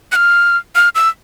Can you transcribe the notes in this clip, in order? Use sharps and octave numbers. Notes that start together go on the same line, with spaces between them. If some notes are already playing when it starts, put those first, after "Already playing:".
F#6
F6
F6
E6